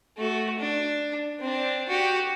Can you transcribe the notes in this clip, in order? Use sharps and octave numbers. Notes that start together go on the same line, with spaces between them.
A3 F#4
D4
C4 D4
F#4 G4